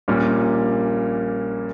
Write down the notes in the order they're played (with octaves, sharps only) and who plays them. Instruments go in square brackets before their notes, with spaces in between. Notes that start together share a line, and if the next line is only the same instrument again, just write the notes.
[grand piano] A#1 A#2 G3 A#3 C#4